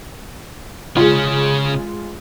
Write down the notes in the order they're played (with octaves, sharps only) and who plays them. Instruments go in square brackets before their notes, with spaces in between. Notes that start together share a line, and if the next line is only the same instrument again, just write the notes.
[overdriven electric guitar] C#3 C#4 [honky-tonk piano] G#3 F4